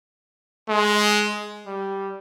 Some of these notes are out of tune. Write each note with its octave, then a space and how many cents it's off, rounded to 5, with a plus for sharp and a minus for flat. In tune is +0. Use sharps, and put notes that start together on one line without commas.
G#3 +10
G3 -5